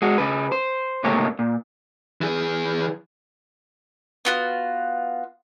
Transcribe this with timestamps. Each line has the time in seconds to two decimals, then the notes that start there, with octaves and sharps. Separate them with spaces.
0.02 G#3 F#4
0.18 C#3 B4
0.52 C5
1.04 C#2 G#2 C3 A3 A#3 C#5
1.39 A#2
2.21 E3 G#4
4.25 B3 F4 F#4